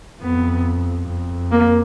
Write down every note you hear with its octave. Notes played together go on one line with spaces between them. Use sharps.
F2 B3
F2
A#3